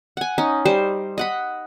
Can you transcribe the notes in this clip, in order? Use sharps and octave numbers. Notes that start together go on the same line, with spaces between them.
F#5 G#5
C#4 D#4
G3 C5
D#5 F#5 B5